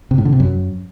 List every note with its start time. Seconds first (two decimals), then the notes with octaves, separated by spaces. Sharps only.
0.11 C3
0.18 A2
0.25 D3
0.33 C3
0.40 F#2